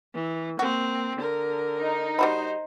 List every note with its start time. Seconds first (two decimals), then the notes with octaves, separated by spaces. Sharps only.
0.14 E3
0.59 A#3 C4 F#4
1.18 D3 A#4
1.79 D#4
2.19 G3 F#4 C5 B5